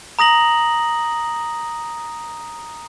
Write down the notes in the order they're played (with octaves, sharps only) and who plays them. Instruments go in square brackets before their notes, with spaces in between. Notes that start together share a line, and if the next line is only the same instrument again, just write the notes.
[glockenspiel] A#5 D#6 A#6 F#7